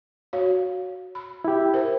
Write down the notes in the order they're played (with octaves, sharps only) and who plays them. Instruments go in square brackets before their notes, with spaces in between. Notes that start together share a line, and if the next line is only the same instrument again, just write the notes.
[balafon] F#4 C#5 F5
B5
[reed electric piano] E4 G4
[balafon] A#4 C5